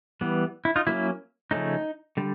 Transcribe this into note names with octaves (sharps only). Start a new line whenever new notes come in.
E3 G3 B3
E4
D#4 F4
F#3 A#3 C#4 E4
C#3 F3 A3 C#4 D#4
D3 G3